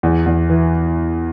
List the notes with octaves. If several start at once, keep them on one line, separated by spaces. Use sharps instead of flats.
E2
E2
E3